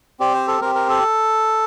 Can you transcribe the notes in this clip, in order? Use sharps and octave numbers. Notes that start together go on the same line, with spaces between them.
C4 G4 D5
C5
A4
C4 G4 A#4
A#4
A4